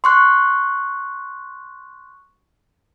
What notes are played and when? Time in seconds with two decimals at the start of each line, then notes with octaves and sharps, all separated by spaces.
0.04 C6 C#6 F#6